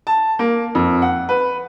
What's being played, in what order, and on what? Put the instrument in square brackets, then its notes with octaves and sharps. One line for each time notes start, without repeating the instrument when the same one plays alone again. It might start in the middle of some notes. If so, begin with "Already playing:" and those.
[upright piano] A5
A#3
F2
F#5
B4